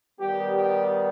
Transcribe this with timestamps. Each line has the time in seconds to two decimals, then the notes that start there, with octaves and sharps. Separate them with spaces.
0.19 D#3 G3 B3 G4
0.53 G4